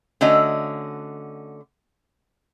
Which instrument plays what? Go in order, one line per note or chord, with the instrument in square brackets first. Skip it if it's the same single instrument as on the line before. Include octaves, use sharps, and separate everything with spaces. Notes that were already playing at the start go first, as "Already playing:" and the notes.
[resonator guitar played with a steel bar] D3 A3 C#4 F#4 D#5